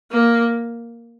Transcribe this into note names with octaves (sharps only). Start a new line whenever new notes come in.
A#3